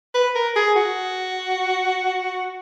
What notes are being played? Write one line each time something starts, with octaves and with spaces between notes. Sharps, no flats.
B4
A#4
G#4
F#4